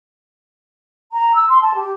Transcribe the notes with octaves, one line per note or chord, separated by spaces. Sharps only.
A#5
E6
C6
A5
G4